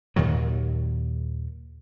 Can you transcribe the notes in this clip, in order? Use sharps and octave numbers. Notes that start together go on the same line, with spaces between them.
D#2 A#2 D#3 F#3